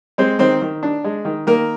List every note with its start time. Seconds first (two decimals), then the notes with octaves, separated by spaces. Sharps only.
0.18 G#3 C4 C5
0.39 D#3 C4 C5
0.62 D#3
0.83 D4
1.04 G#3
1.25 D#3
1.47 D#3 A#3 A#4